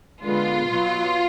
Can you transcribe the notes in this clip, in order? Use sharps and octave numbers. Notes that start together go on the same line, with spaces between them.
D3 G#3 B3 F4
B2 F#3 B3